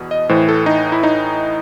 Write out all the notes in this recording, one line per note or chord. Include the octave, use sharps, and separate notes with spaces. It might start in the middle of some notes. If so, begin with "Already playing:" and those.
Already playing: E2 B2
D#5
A2 E3 C5
A4
D#4
E4
D#4